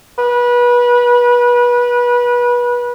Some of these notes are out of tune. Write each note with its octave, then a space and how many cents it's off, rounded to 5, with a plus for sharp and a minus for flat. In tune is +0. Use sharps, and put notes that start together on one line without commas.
B4 -25